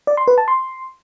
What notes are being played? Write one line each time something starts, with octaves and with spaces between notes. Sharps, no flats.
D5
C6
B4
A5
C6